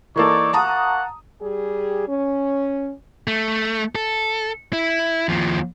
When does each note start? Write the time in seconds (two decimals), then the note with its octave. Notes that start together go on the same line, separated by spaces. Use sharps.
0.16 E3 A#3 D#4 A4 C#5 D5
0.53 A#3 F#4 F#5 A5 A#5 D#6
1.40 G3 G4 G#4
2.08 C#4
3.27 A3
3.95 A4
4.73 E4
5.29 D#2 F3